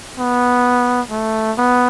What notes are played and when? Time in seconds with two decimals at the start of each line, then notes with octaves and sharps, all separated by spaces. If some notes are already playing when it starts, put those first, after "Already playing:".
0.18 B3
1.10 A3
1.58 B3